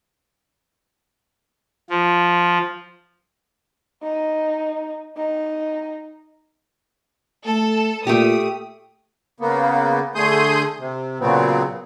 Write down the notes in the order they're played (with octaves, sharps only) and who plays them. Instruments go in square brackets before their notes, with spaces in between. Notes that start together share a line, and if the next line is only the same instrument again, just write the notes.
[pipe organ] F3
[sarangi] D#4
D#4
[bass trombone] A3 [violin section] A4
[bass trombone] A#2 [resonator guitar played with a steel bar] A3 G4 [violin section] D#6
[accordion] C#3 A#3 B3
D3 A3 G#4 C6 D#6 G6
C3
A#2 C#3 F#3 B3 C4